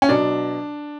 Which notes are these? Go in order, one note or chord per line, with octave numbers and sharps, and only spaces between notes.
C#4
B2 F#3 D4